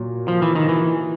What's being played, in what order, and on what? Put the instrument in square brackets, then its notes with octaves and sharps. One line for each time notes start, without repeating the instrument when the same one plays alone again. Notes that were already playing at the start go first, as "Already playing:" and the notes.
Already playing: [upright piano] A#2 F#3
[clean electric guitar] F3
E3
D#3
E3